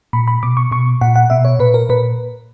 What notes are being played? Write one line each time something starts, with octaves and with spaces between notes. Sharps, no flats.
A#2 B5
B5
B2 D6
C#6
B2 C#6
A#2 F#5
F#5
B2 E5
C#5
A#2 B4
A#4
A#2 B4